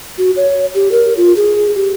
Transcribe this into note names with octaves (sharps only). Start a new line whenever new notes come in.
F#4
C#5
G4
A#4
F4
G#4
G4